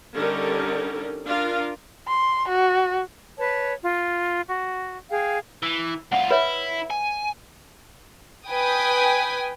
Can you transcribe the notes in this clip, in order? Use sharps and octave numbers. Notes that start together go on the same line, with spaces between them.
D3 G3 C#4 D#4 A4 A#4
D4 F4 A#4 F5
C6
F#4
B4 C#5 A5
F4
F#4
G#4 F5 G5
E3
C2 F4 F#5
E4 B4 C#5 E5
G#5
B4 G5 G#5 D#6